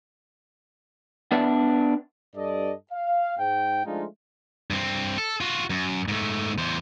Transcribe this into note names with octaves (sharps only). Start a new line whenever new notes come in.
B3 D4 B4 D5 E5
G2 A4 D5 D#5
F5
G#2 G5
F3 G#3 A3 D4 D#4 F4
G2 C4
A4
F4 F#4
F#2
G#2 A3
E2 C5